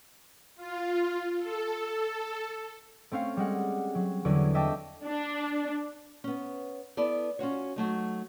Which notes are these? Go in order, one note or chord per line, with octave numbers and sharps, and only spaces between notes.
F4
A4
A3 C4 C#4 F5
G3 G#3 F#5
F#3
E2 D3 F#3 D5 G#5
D#5 E5 G5 A5 D6
D4
B3 C#4
B3 E4 A4 D5
C#4 F4 F#4 C#5
F#3 A3 D#4